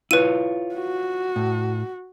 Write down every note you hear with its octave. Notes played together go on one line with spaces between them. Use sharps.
E4 F4 B4 C#5 D#7
F#4
A2